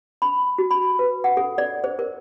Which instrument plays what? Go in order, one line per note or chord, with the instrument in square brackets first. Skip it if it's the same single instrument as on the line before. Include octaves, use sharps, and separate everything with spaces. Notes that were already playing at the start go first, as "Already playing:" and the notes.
[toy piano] B5
F#4
B5
B4
F#5
A4
D5
C5
A#4